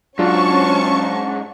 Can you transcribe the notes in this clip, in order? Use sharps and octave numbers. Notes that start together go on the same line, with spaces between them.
G#2 F#3 C#4 D4 F4 A5 C#6